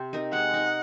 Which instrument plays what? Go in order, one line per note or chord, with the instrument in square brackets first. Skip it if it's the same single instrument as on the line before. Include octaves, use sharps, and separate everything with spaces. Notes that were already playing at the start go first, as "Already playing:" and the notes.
Already playing: [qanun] C3 C4
D#4 A#4
[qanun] G#3 [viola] F#5
[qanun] D#4 A#4